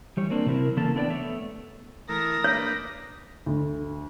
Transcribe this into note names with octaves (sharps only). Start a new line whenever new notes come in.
E3 G3 C#5
A#3 C4 D4
C3 F#3 C4 E4 A#4
C#3 E3 A#3 C#4 A4 A5
A3 B3 D4 C#5 D5 G5
A3 B3 C#5 E5
E3 A3 A#4 D#6 A#6
A#3 D4 B4 C#5
D2